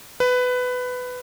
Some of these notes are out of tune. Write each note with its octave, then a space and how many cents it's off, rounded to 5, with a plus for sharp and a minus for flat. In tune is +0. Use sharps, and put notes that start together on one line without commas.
B4 +15